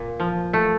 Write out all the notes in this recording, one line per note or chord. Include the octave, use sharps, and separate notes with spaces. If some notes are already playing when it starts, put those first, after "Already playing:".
Already playing: A#2
F3
A3